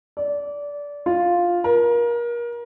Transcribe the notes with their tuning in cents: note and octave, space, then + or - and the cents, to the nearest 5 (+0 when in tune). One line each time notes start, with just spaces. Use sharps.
D5 -20
F4 +5
A#4 +30